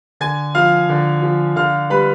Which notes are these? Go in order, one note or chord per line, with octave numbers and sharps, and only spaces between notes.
D3 G#5 G#6
F3 F5 F6
D3
F3
D3 F5 F6
G3 B4 B5